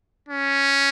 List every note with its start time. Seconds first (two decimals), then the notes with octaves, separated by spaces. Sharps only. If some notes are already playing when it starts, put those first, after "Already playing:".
0.29 C#4